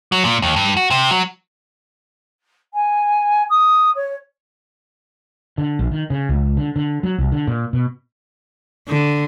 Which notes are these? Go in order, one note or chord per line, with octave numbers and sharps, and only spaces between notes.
F#3
A#2
D#2
G2
F#4
C3
F#3
G#5
D#6
C#5
D3
A#1
D#3
C#3
C#2
D3
D3
F#3
C2
D3
A#2
B2
D3